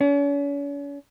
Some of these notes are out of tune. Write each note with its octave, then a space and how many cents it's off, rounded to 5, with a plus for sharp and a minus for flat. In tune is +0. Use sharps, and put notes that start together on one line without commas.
C#4 +40